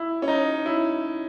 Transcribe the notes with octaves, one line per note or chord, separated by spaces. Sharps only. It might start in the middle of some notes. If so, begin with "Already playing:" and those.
Already playing: E4
C#4
D#4
E4